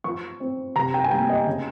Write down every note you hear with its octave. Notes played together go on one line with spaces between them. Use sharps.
F3 C#6
C4
C3 A#5
G5
G#5
G3 A#3 G5
D#5
C#3